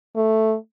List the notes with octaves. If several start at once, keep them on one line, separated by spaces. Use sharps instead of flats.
A3